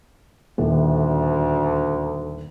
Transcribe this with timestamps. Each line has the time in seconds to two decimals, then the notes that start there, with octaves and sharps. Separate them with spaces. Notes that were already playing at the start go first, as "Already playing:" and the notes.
0.58 D#1 D2